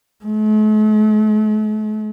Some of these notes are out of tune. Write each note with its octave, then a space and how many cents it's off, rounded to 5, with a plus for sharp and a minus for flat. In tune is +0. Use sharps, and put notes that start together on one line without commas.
A3 -45